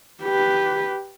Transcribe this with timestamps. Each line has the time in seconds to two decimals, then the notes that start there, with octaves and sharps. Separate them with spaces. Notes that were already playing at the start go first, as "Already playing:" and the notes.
0.23 G4 B4